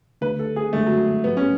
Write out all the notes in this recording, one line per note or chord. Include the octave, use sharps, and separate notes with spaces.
D2 D3 A3 B4
A4
G#4
F#2 D3 G#3 A3
F#3
G#2 F#3 A3 B3
C#4